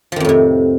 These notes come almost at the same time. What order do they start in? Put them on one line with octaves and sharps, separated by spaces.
F3 D#3 F2 A2 C3